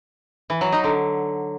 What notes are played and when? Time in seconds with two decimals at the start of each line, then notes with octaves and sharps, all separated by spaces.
0.50 E3
0.61 F#3
0.72 D#4
0.84 D3